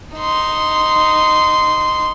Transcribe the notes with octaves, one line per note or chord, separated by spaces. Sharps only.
D#4 C6